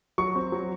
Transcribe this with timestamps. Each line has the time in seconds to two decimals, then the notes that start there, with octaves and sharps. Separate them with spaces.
0.18 F#3 C#6
0.35 C4
0.52 F#3